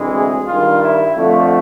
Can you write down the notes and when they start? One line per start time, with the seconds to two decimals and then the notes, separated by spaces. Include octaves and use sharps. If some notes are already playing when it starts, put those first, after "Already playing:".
Already playing: D2 C3 E3 G#3
0.12 G#4
0.46 G2 D#3 G3 F4
0.80 E4
1.15 F2 D3 F3 A3